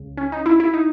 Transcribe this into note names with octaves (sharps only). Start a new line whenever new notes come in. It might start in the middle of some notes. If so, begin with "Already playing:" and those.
Already playing: C#2 C#3
C#4
D#4
E4
E4
D#4